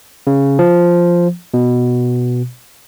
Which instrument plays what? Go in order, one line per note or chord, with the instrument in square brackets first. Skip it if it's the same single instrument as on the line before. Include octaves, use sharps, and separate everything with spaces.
[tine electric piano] C#3
F3
B2